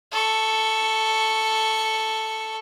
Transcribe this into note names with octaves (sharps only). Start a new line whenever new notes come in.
A4 C#6